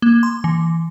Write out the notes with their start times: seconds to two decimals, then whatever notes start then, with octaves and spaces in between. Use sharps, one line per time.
0.02 A#3
0.23 C6
0.44 E3